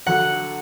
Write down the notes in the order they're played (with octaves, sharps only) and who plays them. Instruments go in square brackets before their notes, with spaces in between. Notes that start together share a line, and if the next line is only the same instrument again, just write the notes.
[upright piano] D3 F#3 [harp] F#5